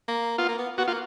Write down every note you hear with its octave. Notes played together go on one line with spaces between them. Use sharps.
A#3
B3 F4
A#3
B3
B3 F#4
A#3 F4